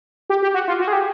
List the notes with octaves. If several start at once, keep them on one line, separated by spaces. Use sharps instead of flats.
G4
G4
F#4
F4
F#4
G#4
G4